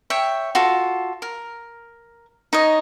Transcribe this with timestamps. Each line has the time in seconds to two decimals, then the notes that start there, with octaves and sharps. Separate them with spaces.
0.10 C#5 E5 G5
0.55 F4 F#4 A4
1.22 A#4
2.53 D#4 C#5 D#5